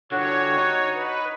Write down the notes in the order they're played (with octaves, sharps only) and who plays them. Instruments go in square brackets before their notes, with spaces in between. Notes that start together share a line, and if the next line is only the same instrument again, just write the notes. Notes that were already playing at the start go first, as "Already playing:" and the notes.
[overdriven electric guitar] G2 D3 [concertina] F#4 [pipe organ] C#5
[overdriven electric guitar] D#4
[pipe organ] B4